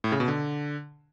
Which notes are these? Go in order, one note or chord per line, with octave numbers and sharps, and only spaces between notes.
A2
C#3
B2
D3